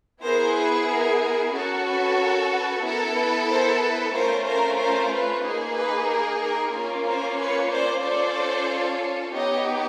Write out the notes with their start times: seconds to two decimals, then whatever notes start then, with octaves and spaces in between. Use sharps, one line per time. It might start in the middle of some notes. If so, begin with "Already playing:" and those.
0.23 B3 E4 G#4 A#4 C5
0.56 B4
0.89 A#4
1.22 A#4
1.53 C#4 F#4 A4 A#4
1.87 B4
2.18 A#4
2.52 B4
2.84 B3 E4 A4 A#4
3.16 B4
3.49 A#4 C5
3.81 B4
4.14 A3 C#4 F4 A#4 C5
4.46 A#4 C5
4.78 A#4 C5
5.11 B4
5.43 A#3 D#4 G#4
5.76 B4
6.08 A#4
6.42 A#4
6.73 A#3 C#4 F4 A#4
7.06 A#4 C5
7.39 B4 C#5
7.71 C5 D5
8.03 C#4 F4 A4 C5 D5
9.34 B3 D#4 G4 C#5 D#5